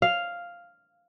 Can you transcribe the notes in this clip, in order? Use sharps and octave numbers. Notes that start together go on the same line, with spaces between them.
F5